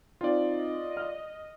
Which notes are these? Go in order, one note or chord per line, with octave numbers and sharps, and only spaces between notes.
C4 D#4 F4 D5
D#5
F6